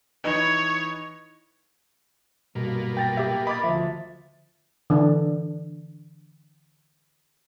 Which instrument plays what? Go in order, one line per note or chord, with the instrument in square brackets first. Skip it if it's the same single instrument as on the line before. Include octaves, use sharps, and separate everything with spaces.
[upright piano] E3 D#4 B4 [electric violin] C#5
[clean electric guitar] B1 G2 [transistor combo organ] A#2 A#3 B3
[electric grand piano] G5 A6 A#6
[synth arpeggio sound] G4 E5
[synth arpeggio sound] D#5 [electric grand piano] B5 D6 A6
[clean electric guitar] D2 E5 [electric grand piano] F3 C5
[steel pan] D3 E3 D4